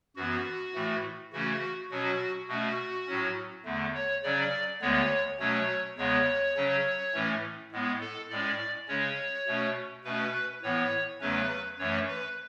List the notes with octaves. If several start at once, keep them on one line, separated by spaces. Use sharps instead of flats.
F#2 E3 B3 F#4
A2 E3 A3
C#3 E3 A3 C#4 F#4
B2 F#3 C#4 F#4
B2 A3 C#4 F#4
A2 F#3 C#4
E2 D3 A3
C#5
C#3 F#3 C#4 D5
D2 D3 G#3 B3 C#5
B2 F#3 A3 C#4 C#5
E2 C#3 G#3 B3 C#5
C#3 F#3 C#4
A2 E3 A3 C#4
A2 G#3 B3
A4
A2 G#3 C#4 D5
C#3 G#3 C#4 C#5
B2 A3 C#4
B2 A3 C#4 B4
A2 E3 B3 C#5
E2 C#3 F#3 A3 C#4 B4
F#2 E3 A3 C#4 C#5
B4